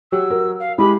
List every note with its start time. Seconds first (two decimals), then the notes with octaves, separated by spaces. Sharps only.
0.12 F#3 G4 E6
0.30 A#4
0.60 F5
0.78 G#3 E4 G4 B5